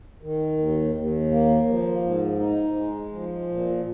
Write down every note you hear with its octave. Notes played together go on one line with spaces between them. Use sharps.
D#3
D#2
D#2
A#3
F3
G#2
D#4
G#3
F3
A#2